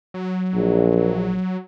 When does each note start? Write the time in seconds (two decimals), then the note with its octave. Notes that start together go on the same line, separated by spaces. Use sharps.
0.14 F#3
0.55 A#1